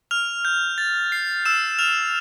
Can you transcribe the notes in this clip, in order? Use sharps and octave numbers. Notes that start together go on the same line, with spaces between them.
F6 F7
G6
A6
C7
E6 E7
F6 F7